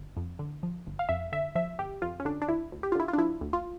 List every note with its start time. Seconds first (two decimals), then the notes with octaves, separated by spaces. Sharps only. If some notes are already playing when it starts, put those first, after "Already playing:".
Already playing: G1
0.17 F2
0.39 D3
0.63 F3
0.86 G1
0.99 F5
1.09 F2 E5
1.32 D3 E5
1.55 F3 E5
1.79 G1 G4
2.02 F2 F4
2.20 C#4
2.25 D3 D4
2.42 D4
2.48 D2 E4
2.72 D2
2.83 G4
2.92 F4
2.95 D3 E4
3.08 F4
3.13 D4
3.18 F3 E4
3.41 D2
3.53 F4